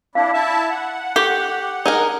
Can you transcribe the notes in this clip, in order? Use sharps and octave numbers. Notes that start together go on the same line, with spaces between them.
D4 E4 F5
E4 E5 A5
F#5
G4 A4 C#6
D#4 G#4 A#4